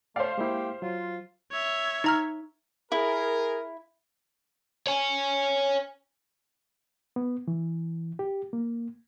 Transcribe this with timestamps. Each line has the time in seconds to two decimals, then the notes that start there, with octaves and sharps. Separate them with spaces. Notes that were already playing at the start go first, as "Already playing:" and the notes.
0.16 A3 C5 D5 F5
0.38 G#3 A#3 E4 G4
0.82 F#3 F4
1.52 C#5 E5
2.04 D#4 A#5 F6
2.92 E4 G#4 A#4
4.87 C#5 G#5
7.16 B3
7.48 E3
8.19 G4
8.53 A#3